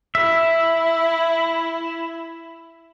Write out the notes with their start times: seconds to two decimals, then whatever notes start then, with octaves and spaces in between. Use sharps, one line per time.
0.15 E4 E5